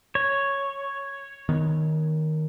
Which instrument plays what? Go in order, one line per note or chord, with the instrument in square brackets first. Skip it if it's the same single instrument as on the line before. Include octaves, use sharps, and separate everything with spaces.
[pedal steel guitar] C#5
[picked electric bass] D#3 B3